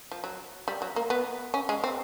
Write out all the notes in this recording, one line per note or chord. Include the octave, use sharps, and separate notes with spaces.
F3
F#3
G3
F#3
A#3
B3
C#4
G#3
C4